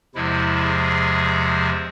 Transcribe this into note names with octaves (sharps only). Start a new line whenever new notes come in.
E2 C3 F3 G#3 E4
G#4